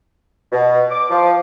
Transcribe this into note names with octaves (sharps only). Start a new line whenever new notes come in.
B2
D6
F3